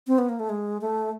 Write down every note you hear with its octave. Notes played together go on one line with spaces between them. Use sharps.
C4
B3
A#3
A3
G#3
A3